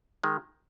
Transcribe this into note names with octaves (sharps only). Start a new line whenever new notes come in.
D#3 G#3